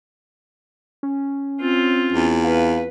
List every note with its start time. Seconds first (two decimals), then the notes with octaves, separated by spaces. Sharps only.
1.03 C#4
1.60 C4 F4
2.12 E2
2.44 B4 F5